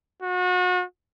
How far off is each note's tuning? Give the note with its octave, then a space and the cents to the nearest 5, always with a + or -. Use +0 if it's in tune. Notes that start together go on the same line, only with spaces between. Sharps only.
F#4 -35